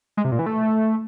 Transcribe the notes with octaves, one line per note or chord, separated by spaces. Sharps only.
G#3
C3
A#2
E3
A3